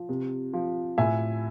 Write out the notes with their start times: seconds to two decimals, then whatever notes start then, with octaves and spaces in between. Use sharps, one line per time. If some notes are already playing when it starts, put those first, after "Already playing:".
Already playing: F3
0.09 C3
0.53 F3
0.98 A2 E5 G#5